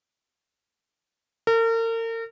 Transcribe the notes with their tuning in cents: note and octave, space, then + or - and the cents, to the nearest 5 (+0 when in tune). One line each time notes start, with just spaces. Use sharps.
A#4 -40